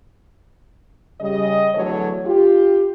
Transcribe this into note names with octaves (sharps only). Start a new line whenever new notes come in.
C#3 G3 D#5
E2 D3 F#3 A3 A4 C#5
F4 G4